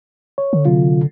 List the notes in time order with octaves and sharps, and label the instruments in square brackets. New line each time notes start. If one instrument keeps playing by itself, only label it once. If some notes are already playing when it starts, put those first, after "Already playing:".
[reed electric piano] C#5
[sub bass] D3
[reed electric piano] C3 F#3 F4